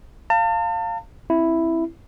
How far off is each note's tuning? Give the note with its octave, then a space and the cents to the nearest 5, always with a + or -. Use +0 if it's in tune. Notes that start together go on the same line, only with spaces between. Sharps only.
F5 +0 A5 +40
C4 +25 E4 +0